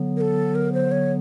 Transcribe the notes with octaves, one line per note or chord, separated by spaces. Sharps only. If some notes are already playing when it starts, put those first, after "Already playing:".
Already playing: D3 F#3 B3
A#4
A4
A#4
C5
C#5